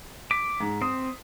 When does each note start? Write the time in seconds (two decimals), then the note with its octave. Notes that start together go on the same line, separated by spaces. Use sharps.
0.31 D6 B6
0.60 G#2
0.82 C4 D#6